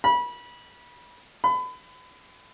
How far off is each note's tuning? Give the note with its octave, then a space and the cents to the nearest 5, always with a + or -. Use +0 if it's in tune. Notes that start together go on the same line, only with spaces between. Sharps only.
B5 -25
B5 +30